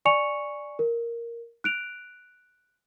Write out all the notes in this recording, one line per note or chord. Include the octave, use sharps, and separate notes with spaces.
D5 G#5 C#6 C#7 F7
A#4
F#6 D7 F7